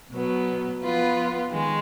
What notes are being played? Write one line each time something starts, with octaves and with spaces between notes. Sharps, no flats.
B2 F#3 B3
F3 B3 F4 B4
D#3 G#3